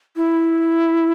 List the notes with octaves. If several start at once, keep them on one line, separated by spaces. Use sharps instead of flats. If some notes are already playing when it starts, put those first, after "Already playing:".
E4